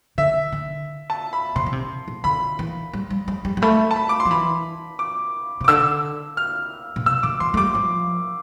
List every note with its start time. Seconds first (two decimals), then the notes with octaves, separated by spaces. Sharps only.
0.18 D3 E5
0.52 D3
1.10 A5
1.33 B5
1.56 C3 C6
1.66 D3
1.73 C3
2.08 B2
2.24 D3 B5
2.59 E3
2.93 G3
3.11 G3
3.28 G3
3.45 G3
3.57 G3
3.62 A3 B5
3.91 A5
3.96 B5
4.09 D6
4.20 C6
4.25 F3
4.31 E3 B5
4.99 D6
5.61 C3
5.64 D6
5.68 D3 E6
6.37 F6
6.96 B2
7.06 C3 E6
7.23 D3 D6
7.40 E3 C6
7.54 A3
7.57 G3 D6
7.75 F3